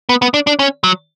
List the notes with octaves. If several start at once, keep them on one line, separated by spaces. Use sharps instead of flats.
B3
B3
D4
D4
C#4
F#3